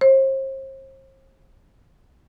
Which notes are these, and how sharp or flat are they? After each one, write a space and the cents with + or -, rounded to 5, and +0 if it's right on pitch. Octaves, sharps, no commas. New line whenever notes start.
C5 +40